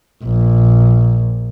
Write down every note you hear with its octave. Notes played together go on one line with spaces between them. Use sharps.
A#1